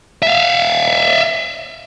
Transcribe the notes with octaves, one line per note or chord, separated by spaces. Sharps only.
E5 F5